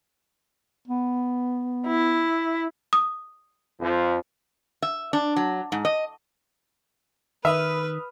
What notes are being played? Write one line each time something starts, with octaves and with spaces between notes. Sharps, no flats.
B3
E4
D#6
F2 F3
E5
D4
F#3
G#2
D#5
D#3 B4 E5 B5 D#6 F6